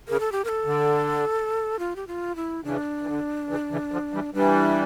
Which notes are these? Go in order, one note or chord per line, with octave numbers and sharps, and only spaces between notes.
C#3 A#4
A4
G4
A#4
A4
D3
F4
G4
F4
E4
C#3 E3 D4
E3
D3
C#3 E3
C#3 E3
D3 F3
E3 G3
E3 G3 D4